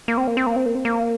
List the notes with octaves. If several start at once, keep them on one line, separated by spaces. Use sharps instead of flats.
A#3
C4
A#3
C4
A#3
C4
A#3
C4
A#3